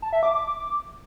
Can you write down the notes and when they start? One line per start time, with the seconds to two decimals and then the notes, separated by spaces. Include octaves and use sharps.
0.02 A5
0.13 E5
0.23 D6
0.33 D6